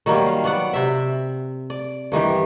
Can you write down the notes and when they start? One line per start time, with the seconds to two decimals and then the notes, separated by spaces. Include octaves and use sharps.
0.06 D#3 F#3 G3 A#3
0.26 F5
0.44 F#3 B3 D5 F#5
0.73 C3 E5
1.70 D5
2.12 G2 D#3 E3 G4